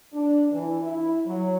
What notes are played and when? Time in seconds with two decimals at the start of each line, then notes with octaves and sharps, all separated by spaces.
0.13 D4
0.51 E3
0.82 E4
1.26 F#3